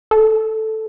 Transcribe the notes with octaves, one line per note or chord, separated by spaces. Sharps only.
A4